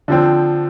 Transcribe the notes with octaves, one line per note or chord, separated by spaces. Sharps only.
D3 F3 C4